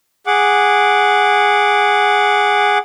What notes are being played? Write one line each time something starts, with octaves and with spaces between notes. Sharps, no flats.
G#4 F#5 D6